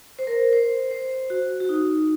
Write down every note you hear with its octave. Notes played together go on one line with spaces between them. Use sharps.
C5
A#4
C5
C5
F#4
F#4
D#4